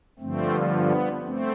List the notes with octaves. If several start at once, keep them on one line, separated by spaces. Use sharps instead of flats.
G2 D3 F3 A3 C4
B3
A3 C4